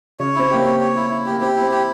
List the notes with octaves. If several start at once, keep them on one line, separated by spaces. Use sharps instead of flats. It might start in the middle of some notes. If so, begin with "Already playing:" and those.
C#3 C#4 C#5
C4 E4
A#3 G4
C4
C#5
C#5
E4
E4
A#3 G4
C4 G4
E4
C4
G4